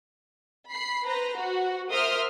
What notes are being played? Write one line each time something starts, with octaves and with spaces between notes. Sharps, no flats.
B5 C7
B4 C5 A#5
F#4
A#4 C5 E5 C6 D#6 F6